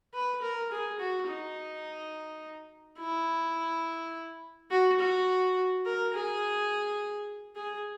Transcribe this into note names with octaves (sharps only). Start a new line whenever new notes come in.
B4
A#4
G#4
F#4
D#4
E4
F#4
F#4
A#4
G#4
G#4